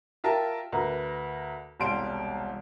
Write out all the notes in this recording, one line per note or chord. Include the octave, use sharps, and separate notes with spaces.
F4 G4 A#4 E5 A5
D2 A#4 B4 A#5
E1 C2 G3 F5 C6 D7